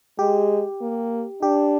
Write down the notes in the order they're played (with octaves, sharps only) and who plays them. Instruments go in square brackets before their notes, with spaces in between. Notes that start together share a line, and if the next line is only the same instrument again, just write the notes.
[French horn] G#3 [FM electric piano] G4
[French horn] A#3
[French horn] D4 [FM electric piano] G4